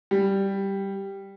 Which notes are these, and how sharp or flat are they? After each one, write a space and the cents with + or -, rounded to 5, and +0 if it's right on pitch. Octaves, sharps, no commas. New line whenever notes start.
G3 +0